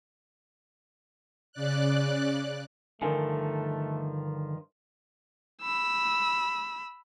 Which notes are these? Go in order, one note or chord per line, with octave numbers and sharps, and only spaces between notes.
C#3 D5 F#6
G2 D3 D#3 F3 A3 A#4 G#5
B5 E6